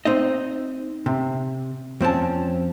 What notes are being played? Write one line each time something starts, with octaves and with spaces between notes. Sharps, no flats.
C4 D#4 D#5
C3
F2 C4 C#4 A5